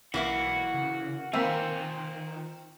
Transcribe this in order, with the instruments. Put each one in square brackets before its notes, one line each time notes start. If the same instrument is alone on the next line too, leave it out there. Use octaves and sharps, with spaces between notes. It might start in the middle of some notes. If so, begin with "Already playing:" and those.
[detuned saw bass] B1 [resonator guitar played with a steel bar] E3 A#3 E4 [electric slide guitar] F#4
[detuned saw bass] C#3
[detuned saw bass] D#3 [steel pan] A#3 E5 [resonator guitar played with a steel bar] C4 [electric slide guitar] F4 G#5 A#5